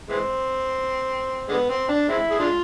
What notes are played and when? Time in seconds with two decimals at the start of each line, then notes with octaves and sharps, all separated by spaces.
0.09 E3 G#3 C4
1.49 D3 G#3 B3
1.69 C4
1.88 D4
2.09 G#3 C4 E4
2.30 G#4
2.39 G#3 D4 F4